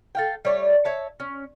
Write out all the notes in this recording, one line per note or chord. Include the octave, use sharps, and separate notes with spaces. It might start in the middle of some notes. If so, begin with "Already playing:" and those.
A4 F5 G5
G3 A3 C#5 D5
C#5 E5 A5
C#4